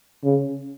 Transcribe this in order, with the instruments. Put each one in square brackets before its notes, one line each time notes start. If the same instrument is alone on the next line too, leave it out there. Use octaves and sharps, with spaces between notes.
[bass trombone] C#3